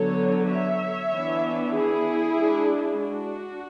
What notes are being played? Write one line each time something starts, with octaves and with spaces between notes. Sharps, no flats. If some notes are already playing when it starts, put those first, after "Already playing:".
Already playing: D3 F#3 B3 A4 C#5
C#5 E5
E3 B3 D4
E4 G#4
G#3 D4
D4 F#4